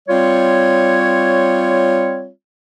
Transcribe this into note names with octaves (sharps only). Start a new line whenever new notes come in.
G3 C4 F4 C#5